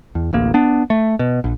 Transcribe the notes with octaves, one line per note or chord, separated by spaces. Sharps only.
E2
D1 A1 A#3
B3 D4
A3
B2
A#1